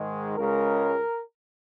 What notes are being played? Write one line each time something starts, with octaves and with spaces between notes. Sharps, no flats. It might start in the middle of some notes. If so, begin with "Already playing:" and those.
Already playing: G#2 D#3 G#3
C#2 C#3 G#3 A#4